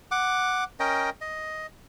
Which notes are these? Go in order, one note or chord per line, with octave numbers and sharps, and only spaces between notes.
F#5 D6
C#4 A#4 D#5 G5
D#5